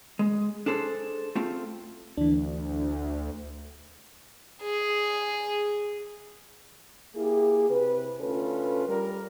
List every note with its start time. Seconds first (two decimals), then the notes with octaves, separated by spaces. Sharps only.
0.19 G#3
0.66 D4 G#4 A4 C5
1.35 A3 C4 F4
2.17 D2 E3 D4
4.62 G#4
7.16 A#3 E4 G4 G#4
7.70 C3 B4
8.20 D2 C#4 F4 A4 B4
8.88 G3 A#4